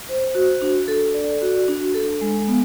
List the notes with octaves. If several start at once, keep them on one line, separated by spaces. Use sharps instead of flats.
C5
F#4
D4
A4
D5
F#4
D4
A4
G#3
B3